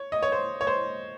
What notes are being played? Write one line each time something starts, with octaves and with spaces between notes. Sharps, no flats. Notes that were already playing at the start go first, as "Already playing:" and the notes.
Already playing: C#5
D#5
C#5
C5
C#5
C5